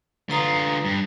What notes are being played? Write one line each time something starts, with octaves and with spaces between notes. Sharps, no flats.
D3 F4 B4 A#5 D#6
G2